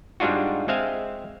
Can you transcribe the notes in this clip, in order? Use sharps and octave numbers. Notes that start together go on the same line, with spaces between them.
G#2 G3 G#3 D4 F4 F#4
G#3 C4 E5 F5 G#5